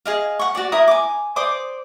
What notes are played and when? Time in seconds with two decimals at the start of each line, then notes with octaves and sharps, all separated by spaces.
0.05 G#4 D#5 F5
0.39 F#5 C#6
0.55 F#4 G4 D5
0.72 E4 A#4 A#5 D#6
0.88 G#5 D6
1.36 C5 D5 D6 D#6